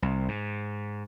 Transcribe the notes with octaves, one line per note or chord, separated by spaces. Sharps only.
C2
G#2